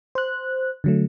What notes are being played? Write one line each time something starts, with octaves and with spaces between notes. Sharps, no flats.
C5 F#6
D3 F#3 A3